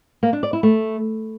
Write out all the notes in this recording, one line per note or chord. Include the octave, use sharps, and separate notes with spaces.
A#3
D4
D5
E4
A3